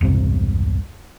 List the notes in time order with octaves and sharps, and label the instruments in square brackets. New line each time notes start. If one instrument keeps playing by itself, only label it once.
[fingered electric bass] E1 C2 G2 C3